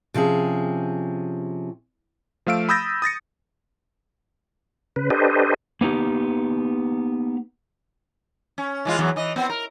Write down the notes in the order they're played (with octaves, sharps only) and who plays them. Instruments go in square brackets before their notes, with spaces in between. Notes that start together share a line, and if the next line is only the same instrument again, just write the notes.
[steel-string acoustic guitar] C3 F3 C#4 G#4
[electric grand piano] F3 A3 F5 E6 D7
B5 D#6 E6 G6 A6 A#6
D#6 A6 A#6 C#7
[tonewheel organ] C#3 B4
D4 G4 A4 B4 C5 D#5
[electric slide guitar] A#3 B3 D#4 G4
[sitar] C#4
E3 G#3 F4
E2 E3 F#3
E3 D#5
B3 C4
A#4